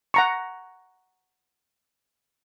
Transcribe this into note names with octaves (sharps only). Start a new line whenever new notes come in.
F#5 A#5 C#6